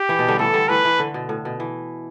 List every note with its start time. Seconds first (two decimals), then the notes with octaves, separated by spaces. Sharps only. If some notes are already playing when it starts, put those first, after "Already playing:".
Already playing: G4
0.09 E3
0.19 B2
0.28 D3 G3
0.39 E3 A3 A4
0.54 D3 G3
0.69 E3 A3 B4
0.85 E3
0.99 D3
1.14 B2
1.29 A2
1.45 B2
1.60 E3